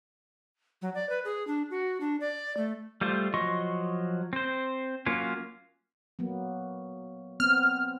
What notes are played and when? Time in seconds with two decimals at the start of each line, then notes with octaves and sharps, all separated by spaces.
0.82 F#3
0.95 D5
1.09 B4
1.25 G#4
1.47 D4
1.71 F#4
2.01 D4
2.20 D5
2.57 A3
3.01 G3 A3 F4 C5
3.34 F3 F#3 D#5 C6 C#6
4.33 C4 C5
5.06 F#3 A#3 C#4 F4
6.19 F#3 A#3 B3
7.40 B3 C4 F6